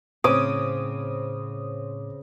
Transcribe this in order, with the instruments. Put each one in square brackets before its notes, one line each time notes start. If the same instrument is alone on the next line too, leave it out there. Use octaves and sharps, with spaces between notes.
[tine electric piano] A2 C#5 D6 [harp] C#3 [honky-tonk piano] C4 [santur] D#6